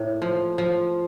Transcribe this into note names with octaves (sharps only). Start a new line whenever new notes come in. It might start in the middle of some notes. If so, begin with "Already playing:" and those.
Already playing: A2 A#3
F3
F3